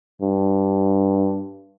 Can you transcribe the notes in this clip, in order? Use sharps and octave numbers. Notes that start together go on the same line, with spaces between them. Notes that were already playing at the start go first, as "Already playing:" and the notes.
G2